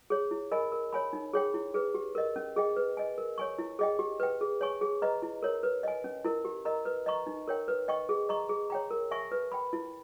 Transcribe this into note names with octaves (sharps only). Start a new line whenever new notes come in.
G#4 C#5
E4
A#4 D#5 G#5 B5
A#4
C#5 G#5 B5
D#4
G#4 C#5 G5
E4
G#4 B4
G4
A#4 D#5
C#4
G#4 D#5 G5
B4
D#5 G#5
A#4
C#5 G#5 C#6
E4
G#4 D#5 G5
G4
B4 G5
G#4
C#5 G#5 C#6
G#4
B4 D#5 A#5
E4
A#4 C#5
B4
D#5 G#5
C#4
E4 A#4
G4
A#4 D#5 A#5
B4
D#5 A#5 C#6
D#4
A#4 C#5 G5
B4
D#5 G5 C#6
G#4
D#5 A#5 C#6
G#4
C#5 G5 A#5
A#4
E5 G#5 C#6
B4
G5 B5
E4